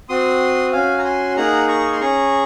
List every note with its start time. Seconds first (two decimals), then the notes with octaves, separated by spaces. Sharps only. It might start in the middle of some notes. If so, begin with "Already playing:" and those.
0.09 C4 F#4 C6 D#6
0.72 C#4 F#4 F5 G#5
0.99 A#5
1.05 G#5 C6
1.37 A#3 D#4 G#4 F#5 A#5
1.68 A#5 C#6
1.92 C6
2.00 C#4 G#4 A#5 C#6